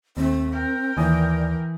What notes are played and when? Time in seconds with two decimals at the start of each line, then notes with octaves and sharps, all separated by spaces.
0.17 D#2 A3 C4
0.52 A#4 G5
0.97 D#2 E3 D5 G#5 D#6